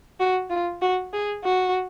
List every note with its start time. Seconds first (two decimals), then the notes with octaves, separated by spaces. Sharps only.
0.20 F#4
0.50 F4
0.82 F#4
1.13 G#4
1.44 F#4